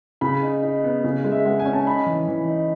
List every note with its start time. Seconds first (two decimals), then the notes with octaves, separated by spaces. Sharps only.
0.21 C#3 B5
0.42 D#4
0.63 D#4
0.84 B3
1.04 C#3
1.24 G#3
1.32 E5
1.45 G#3 F#5
1.60 G#5
1.65 C#4
1.73 A5
1.86 D#4 B5
2.06 E3
2.28 E3
2.47 D#4